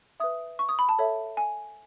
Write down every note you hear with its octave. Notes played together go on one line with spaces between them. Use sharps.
B4 E5 D#6
C#6
D#6
B5
A5
A4 C#5 E5
G#5